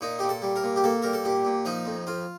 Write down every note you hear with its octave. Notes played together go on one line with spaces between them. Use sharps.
A#2 D#4
A#2 G4
A4
G3
A#4
A#2
G4
A#3 A4
G3 A#4
A4
A#2 G4
A#2
F3 D#4
F2
F2 F4